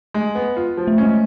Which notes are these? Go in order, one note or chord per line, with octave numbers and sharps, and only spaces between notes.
G#3
B3
F4
F3
A3
C#4
G#3